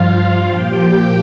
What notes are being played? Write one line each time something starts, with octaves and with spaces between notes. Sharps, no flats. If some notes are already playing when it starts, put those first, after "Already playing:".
Already playing: G2 F3 F4 F5
A#2 F3 G4 G5